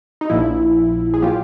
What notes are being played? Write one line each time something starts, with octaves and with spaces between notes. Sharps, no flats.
D#4
A#1 A#2 F3 E4
G#4
A#2 F#3 F4 G4